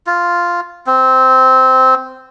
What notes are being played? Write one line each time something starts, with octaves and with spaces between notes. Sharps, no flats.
F4
C4